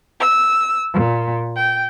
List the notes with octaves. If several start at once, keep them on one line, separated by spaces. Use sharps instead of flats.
E6
A#2
G5